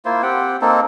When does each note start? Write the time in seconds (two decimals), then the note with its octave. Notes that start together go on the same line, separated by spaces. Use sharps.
0.05 A#3 E4 F4 C5
0.23 C4 G4 F#5 G5
0.61 A#3 C4 D#4 A4